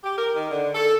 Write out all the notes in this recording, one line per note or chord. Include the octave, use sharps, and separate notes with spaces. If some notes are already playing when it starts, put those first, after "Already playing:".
G4
A#4
D#3
D3
A4